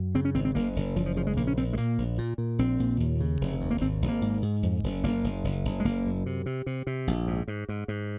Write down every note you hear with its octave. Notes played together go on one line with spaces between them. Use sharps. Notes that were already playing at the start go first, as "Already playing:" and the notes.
Already playing: F#2
C#3 C4
C#4
G#1 C4
C4
F#1 A#3
F#1
F#1 F3
F3
C#3 F3
G#3
A#1 A#3
C#4
A#1 C4
G#3
A#2 A#3
A#1
A#2
A#2
A#1 C4
A#2
D#2
C#3
F1
D#2
A#3
G#1 C4
G#1
A#3
G#2
G#2
F2
F#1
F#1 A#3
F#1
F#1
F#1
G#3
F#1 A#3
F#2
C3
C3
C3
C3
A#1
G#2
G#2
G#2
G#2